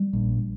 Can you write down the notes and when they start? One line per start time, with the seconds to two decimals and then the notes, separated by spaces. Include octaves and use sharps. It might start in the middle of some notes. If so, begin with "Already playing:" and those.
Already playing: G3
0.13 A#1